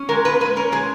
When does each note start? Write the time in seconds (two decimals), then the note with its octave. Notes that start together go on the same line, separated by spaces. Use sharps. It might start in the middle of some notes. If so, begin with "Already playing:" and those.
Already playing: C#4
0.09 G#3 A#4
0.25 A#2 B4
0.40 A#2 B4
0.56 C#4 A#4
0.72 G#3 G#4